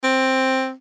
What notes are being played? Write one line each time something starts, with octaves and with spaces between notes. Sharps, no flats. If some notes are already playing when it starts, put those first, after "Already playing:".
C4